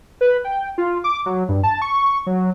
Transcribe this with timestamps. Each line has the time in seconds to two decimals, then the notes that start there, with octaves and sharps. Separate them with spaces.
0.21 B4
0.45 G5
0.78 F4
1.04 D6
1.26 F#3
1.49 G2
1.64 A5
1.82 C#6
2.27 F#3